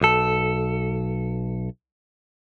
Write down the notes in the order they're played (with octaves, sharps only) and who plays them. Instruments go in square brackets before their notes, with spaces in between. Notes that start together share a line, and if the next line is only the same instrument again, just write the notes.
[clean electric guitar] B1 A4